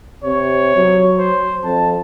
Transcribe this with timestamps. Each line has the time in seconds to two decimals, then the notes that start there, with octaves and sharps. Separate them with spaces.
0.24 C3 C#5
0.76 F#3
1.18 C5
1.64 F2 A5